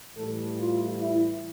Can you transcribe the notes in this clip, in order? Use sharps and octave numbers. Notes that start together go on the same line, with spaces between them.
A2 E3 G3 A4
F4
E4